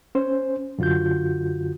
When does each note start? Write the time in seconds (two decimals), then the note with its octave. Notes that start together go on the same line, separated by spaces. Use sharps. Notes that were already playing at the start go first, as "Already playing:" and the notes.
0.15 C#4 C5
0.78 F#2 D3 F4 F#4 G6